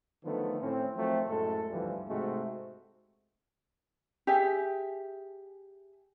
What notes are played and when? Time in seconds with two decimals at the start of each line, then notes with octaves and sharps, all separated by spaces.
0.24 D3 D#3 F3 F#3 A3 B3
0.61 A2 C4 C#4
0.96 D#3 F3 F#3 A3 C4
1.28 F#2 A2 G#3 A3 A4
1.70 D2 G2 E3 F3 G3
2.08 G#2 C3 G#3 A3 C4 F#4
4.27 G4 G#4 E5 G#5